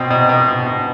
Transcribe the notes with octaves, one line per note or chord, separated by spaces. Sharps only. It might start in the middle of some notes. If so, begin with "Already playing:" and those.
Already playing: B2 C4
B2
B2
B2
B2